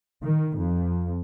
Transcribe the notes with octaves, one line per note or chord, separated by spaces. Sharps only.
D#3
F2